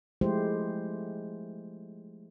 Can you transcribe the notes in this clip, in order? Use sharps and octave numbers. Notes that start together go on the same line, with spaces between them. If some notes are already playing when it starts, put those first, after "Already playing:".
F3 G#3 A3 E4 G4 C5